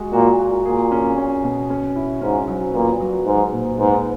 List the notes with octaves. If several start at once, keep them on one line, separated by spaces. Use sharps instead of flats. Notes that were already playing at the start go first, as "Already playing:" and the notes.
Already playing: G#3 F#4
A#2 F#4
F#4
A#2 G#4
C#4
C#4
B2
C#4
E4
G#2 C#4
F#3
A#2 B3
F#3
G#2 F#3
A#2
G#2 B3